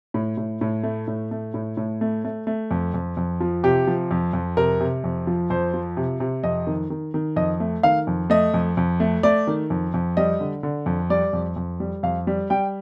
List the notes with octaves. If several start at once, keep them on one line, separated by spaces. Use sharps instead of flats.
A2
A2
A2
A3
A2
A3
A2
A2
A3
A3
A3
F2
F2
F2
F3
C3 G4
F3
F2
F2
C3 A#4
C3
F2
F3
F2 C5
F3
C3
C3
F2 D#5
D#3
D#3
D#3
F2 D#5
A3
D#3 F5
F2
A3 D#5
F2
F2
A3
A3 D5
D#3
F2
F2
G3 D#5
D3
D3
F2
G3 D5
F2
F2
G3
F2 F5
G3
G3 G5